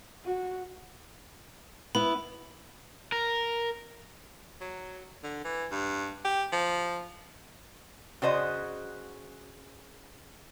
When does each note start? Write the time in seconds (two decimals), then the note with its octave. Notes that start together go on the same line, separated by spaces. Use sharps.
0.24 F#4
1.95 B3 E4 B5
3.12 A#4
4.61 F#3
5.23 D3
5.44 E3
5.71 G2
6.25 G4
6.52 F3
8.22 C#3 F#4 C5 D#5